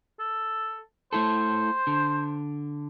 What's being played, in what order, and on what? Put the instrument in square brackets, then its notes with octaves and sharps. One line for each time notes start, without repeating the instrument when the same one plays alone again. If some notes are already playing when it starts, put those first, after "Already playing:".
[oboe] A4
[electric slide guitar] A3 E4 A4 [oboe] C5
[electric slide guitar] D3